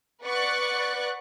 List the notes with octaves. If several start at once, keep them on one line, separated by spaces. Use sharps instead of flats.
B4 D5 F#5 C#6 F#6 A6